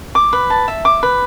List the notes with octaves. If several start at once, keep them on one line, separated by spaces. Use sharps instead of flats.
D6
B4
A5
E5
D6
B4